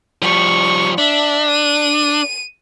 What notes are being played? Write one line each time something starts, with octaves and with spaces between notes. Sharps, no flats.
F3 G3 C#6
D4 E5
D#7